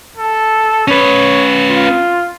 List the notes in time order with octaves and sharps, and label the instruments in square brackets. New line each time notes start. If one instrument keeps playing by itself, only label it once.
[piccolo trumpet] A4
[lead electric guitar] C#4 B4 [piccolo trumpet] C#5
[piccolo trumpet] F4